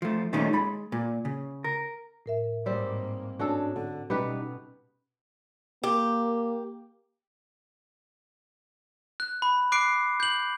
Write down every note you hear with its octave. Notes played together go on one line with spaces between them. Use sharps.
F3 A3
A#2 D#3 G3 A3 C#4 D#4
G#3 B5
A#2
C#3
A#4
A2 A#4 E5
G#2 G3 A#3 C4
G#2 C#4 D4 F#4 A4
D3
B2 G3 B3 C#4 D#4 G4 B4
A#3 G4
F#6
B5
D6 F#6 C7 D7
G6 F#7